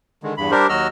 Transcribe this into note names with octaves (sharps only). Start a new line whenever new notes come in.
D3 D#3 G#3
E2 G2 B5
G3 D4 G4 A#4 C5
D#2 F#3 F#4 D#5 E6 F6